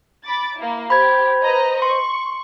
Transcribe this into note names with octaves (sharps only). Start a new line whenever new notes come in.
B5 D6 A6
A#3 E4
G4 C5 B5 G#6
B4 D#5 A#5
C6 C#6